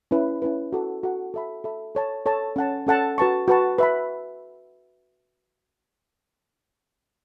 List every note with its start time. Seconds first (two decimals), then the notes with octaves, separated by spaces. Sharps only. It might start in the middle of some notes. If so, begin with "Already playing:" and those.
0.11 C#4 E4 B4
0.42 C#4 E4 B4
0.73 F#4 A4 F#5
1.03 F#4 A4 F#5
1.34 A4 E5 B5
1.64 A4 E5 B5
1.95 A4 C#5 A5
2.26 A4 C#5 A5
2.56 C#4 A4 F#5 A5
2.87 C#4 A4 F#5 A5
3.18 F#4 B4 A5 C#6
3.48 F#4 B4 A5 C#6
3.78 B4 E5 B5